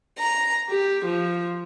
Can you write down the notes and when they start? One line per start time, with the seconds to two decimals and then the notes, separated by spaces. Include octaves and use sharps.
0.18 A#5
0.68 G4
1.05 F3